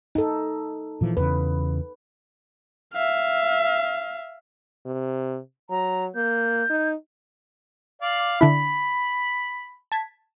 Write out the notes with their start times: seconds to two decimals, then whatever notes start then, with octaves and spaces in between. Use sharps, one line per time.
0.15 D#4 A4
1.01 A#2 E3 F3
1.17 E2 C#3 B4
2.94 E5 F5
4.86 C3
5.70 F#3 A#5
6.16 A#3 G6
6.70 D#4
8.02 D5 F5
8.41 D3 D4 E4 B5
9.92 A5 G#6 B6